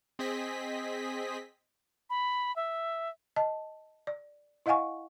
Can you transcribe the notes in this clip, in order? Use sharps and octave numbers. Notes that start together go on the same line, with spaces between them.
C4 G#4 D#5 B6
B5
E5
D#5 A5
D5
E4 D#5 F5 F#5 G#5 C#6